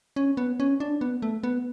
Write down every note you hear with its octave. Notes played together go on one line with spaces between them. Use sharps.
C#4
B3
C#4
D4
B3
A3
B3